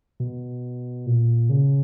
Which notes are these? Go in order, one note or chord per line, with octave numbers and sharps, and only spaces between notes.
B2
A#2
C#3